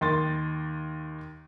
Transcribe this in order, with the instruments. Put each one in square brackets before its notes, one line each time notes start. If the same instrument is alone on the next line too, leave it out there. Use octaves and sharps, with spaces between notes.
[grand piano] D#2 D#3 C6 A6